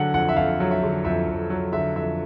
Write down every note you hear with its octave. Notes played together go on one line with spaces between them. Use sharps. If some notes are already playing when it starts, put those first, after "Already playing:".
Already playing: D3 F#3 F#5
F2 F#5
E5
F2 F5
F#3
E5
D3
F2 E5
F2
F#3
D3 E5
F2 E5